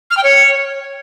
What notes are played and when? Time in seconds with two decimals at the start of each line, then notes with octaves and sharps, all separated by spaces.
0.11 F6
0.17 G5
0.24 C#5